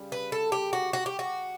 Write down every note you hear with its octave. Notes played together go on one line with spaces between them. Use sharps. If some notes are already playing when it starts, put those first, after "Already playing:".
Already playing: C#3 G3
B4
A4
G4
F#4
F#4
G4
F#4